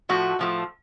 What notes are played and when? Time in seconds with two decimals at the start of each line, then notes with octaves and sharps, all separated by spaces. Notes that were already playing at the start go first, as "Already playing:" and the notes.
0.09 A2 F3 A3 F#4
0.39 A2 F3 A3